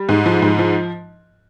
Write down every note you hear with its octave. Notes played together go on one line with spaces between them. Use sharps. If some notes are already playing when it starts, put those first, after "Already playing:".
Already playing: G3
G#2
F3
G#2
F3